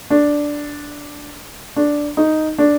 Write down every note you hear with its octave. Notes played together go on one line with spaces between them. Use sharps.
D4
D4
D#4
D4